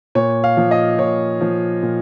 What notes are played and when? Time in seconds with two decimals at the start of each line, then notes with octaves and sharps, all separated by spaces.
0.15 A#2 C#5
0.44 F5
0.57 F3
0.71 D#5
0.99 A#2 C#5
1.41 F3
1.83 A#2